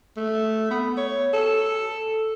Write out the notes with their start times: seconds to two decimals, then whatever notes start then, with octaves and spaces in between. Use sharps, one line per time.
0.17 A3
0.70 B3
0.97 C#5
1.33 A4